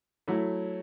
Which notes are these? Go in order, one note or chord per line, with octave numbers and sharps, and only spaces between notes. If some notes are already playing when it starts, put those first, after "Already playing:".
F#3 A3 E4